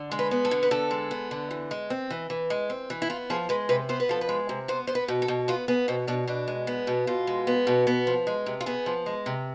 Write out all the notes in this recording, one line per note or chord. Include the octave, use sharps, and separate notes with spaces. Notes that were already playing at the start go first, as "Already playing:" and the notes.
Already playing: D3
G#3
B4
B3
A4
D3
B4
D3 A4
G#3
B3
D3
E3
G#3
C4
E3
E3
G#3
C4
E3
E4
B3 F4
F3 G#4
G#3 B4
C3 B4
B3 C5
B4
F3 A4
B4
G#3
C3
B3 C5
B3 C5
B4
B2
A4
B2
B3 F4
B3 G#4
B2 C4
B2 D4
B2 D4
G#3
B3
B2
B2 F4
G#3
B3
B2
B3
F3
G#3
C3
F4
B3 G#4
F3
G#3
C3